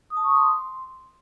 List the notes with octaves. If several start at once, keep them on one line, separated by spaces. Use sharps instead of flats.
D#6
A5
C#6
D#6
C6